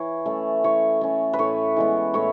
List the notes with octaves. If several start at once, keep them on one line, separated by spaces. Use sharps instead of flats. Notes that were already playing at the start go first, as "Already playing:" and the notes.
Already playing: E3 C#5
A3 C#4
E3 C#5
A3 C#4
B4
A2 C#5
E3 G#3 B3
A2 C#5